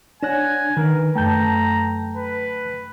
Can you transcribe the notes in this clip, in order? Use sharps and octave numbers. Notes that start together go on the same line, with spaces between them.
D4 C#5 F#5 G#5 F#6 A#6 E7
D#3 A#4 B4
F#2 D3 A3 G5 A5 A#5 G6
B4